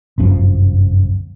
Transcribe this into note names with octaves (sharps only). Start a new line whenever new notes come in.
G1 C2 F#2 F3